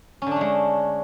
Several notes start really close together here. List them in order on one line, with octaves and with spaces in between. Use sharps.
C#4 D3 D4 A3 G#3